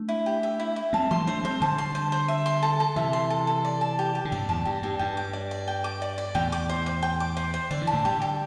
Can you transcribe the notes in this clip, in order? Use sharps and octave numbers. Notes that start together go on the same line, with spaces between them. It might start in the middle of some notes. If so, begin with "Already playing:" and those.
Already playing: A3 D4
E4
G4
E5
E4
E4
G3 C4 A5
E3 A3 C6
A3 D4 C5
G3 C4 C5
D3 G3 A5
C6
C5
C5
E5
C6
A4
A4
C3 E3 E5
C6
A4
A4
D5
A5
G4
G4
D3
G2 C3 D5
E2 A2 A5
G2 G4
G2 G4
G2 G5
D6
D5
D5
G5
D6
D5
D5
E2 A2 G5
D6
C5
C5
G5
D6
C5
C5
D3 D5
E3
A5
A2 D3
D3 G3 G4
G4